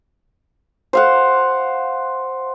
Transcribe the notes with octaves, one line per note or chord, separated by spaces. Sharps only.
C5 F5 F#5